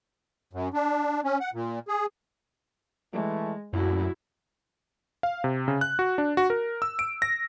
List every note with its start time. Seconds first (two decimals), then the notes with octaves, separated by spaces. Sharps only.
0.53 F#2
0.74 D4
1.24 C#4
1.40 F#5
1.54 A#2
1.88 G#4
3.13 E3 G#3 A3
3.73 C2 F#2 A#2 A3 E4 F#4
5.23 F5
5.44 C3
5.68 C#3
5.81 F#6
5.99 F#4
6.18 D4
6.37 F#4
6.50 A#4
6.82 E6
6.99 D7
7.22 A#6